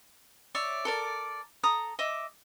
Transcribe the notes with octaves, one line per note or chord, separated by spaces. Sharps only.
C#5 D5 E5
A4 A#4 D5
A4 A#5 D#6
D#5 E5 D6